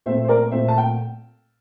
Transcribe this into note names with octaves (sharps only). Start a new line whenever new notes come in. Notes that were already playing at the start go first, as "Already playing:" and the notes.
A#2 A3 C4 C5 E5
C5
A#4 D5
A#2 A3 C4 C5 E5
A5
G5